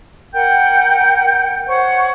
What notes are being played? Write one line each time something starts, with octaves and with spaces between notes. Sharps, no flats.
A#4 F#5 G5 G6
C5 C#5 F#5 C#6